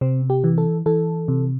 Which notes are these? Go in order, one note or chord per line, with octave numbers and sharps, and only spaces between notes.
C3 C4
G4
E3
A4
E3 A4
C3